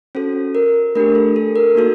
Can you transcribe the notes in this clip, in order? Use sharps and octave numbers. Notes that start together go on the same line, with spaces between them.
C#4 F#4 A4 C5
A#4
A3 D4 G4 A#4
A4
A4
A#4
A#3 D#4 F#4 A4